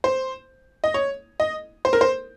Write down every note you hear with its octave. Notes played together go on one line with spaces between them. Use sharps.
C5
D#5
C#5
D#5
C5
A#4
C5